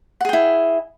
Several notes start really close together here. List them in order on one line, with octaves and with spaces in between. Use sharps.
F#5 G#4 G5 E4